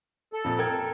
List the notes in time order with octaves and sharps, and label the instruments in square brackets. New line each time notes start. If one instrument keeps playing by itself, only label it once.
[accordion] A4
[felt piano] F2 A#2
A#4 G5 G#6